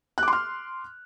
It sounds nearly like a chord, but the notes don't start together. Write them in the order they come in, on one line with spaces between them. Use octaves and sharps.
F#6 D6 C6 F6